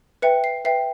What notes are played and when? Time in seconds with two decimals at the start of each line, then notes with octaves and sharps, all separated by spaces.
0.22 B4 E5 G5 C#7
0.44 C7
0.65 B4 E5 G5 C7